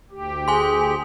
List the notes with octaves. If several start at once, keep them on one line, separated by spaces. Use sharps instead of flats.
D2 G4
G#4 G#5 C6